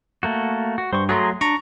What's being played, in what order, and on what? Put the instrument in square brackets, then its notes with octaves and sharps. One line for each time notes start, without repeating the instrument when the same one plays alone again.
[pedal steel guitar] A3 A#3 F#4
F#4
[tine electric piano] G2 [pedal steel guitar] C5 C#6
[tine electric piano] F#3 A3 [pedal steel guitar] G#4 A#5 C6
[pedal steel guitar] D4 [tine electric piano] A#5 C#6